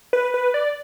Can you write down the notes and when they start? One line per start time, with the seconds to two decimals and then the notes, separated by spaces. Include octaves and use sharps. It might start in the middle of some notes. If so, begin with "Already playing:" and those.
0.13 B4
0.34 B4
0.54 D5